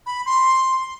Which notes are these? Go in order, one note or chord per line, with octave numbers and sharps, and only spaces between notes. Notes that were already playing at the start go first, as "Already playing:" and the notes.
B5
C6